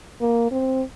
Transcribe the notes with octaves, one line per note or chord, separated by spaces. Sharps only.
A#3
C4